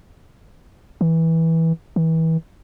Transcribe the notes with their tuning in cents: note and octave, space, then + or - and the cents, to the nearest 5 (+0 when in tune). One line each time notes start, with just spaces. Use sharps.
E3 -15
E3 -30